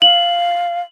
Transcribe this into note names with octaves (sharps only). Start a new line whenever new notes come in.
F5 F#7